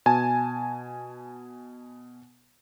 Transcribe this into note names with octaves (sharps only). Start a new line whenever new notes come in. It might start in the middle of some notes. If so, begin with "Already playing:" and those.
B2 G#5 A5